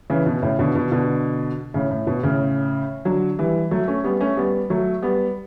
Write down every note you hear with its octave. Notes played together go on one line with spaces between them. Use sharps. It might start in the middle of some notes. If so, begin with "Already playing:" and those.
C#3 E3
B2
A2 C#3
B2 D3
B2
B2 D3
A2 C#3
A2
B2
A2 C#3
D3 F#3
E3 G3
F#3 A3
A3 C#4
G3 B3
A3 C#4
G3 B3
F#3 A3
G3 B3